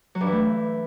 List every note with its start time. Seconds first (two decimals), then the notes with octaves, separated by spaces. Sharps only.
0.15 F#3
0.21 G2
0.26 E3
0.32 A3